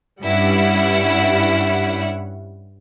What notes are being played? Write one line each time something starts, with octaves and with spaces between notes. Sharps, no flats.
G2 G3 C#4 E4 F#5